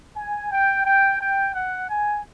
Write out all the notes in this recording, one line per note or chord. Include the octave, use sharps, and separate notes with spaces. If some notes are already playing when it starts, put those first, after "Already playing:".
G#5
G5
G5
G5
F#5
G#5